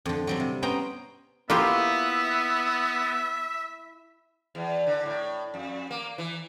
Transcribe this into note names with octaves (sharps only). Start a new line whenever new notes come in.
F2 D3
F#3 G3 C4
C3
B3 C#4 C5 G5 A#5
A#3 B3 E4 F4 G4 E5
E2
D3
A2
F2
A#3
E3